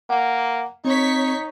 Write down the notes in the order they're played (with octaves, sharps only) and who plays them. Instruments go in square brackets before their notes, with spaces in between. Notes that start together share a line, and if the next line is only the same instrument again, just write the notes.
[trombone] A#3 [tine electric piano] F#5
[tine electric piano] C4 [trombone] D#4 [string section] C#5 C#6 B6